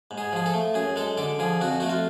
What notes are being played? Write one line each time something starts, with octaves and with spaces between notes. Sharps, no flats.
G#2
G#4
F3 G#4
A4
A3
F#2 G#4
G#3 A4
D3 A4
F3 G#4
F2 F#4
A3 F#4
F4